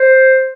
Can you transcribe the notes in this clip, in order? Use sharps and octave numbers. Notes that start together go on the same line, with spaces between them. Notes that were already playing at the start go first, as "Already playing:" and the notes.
Already playing: C5